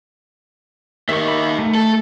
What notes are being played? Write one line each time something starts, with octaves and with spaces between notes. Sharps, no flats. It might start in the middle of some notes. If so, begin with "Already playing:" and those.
D#3 A#3 E5 C#6
E5 B5
A3
A4